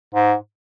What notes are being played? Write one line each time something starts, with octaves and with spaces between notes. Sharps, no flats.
G#2